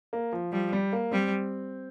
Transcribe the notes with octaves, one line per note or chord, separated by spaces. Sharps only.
A#3
F3
F3 G3
G3
A#3
G3 C4